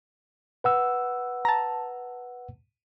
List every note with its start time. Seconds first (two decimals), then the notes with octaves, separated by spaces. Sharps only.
0.64 B4 F#5 E6
1.45 A5 A#5